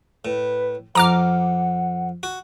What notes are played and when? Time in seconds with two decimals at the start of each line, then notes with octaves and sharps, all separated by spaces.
0.25 A2 B4
0.95 F2 F#5 A#5 D6 F6
2.23 F#4